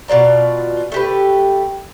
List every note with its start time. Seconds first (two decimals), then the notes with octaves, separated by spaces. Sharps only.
0.08 B2 F4 D5 A#5
0.92 A3 G4 B4